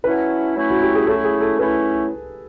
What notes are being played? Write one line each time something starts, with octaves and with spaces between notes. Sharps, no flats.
F#3 A3 C#4 E4 B4
F#3 A3 C#4 E4
F#4
G4
G#4
F#3 A3 C#4 E4 A4
G#4
A4
F#3 A3 C#4 E4 B4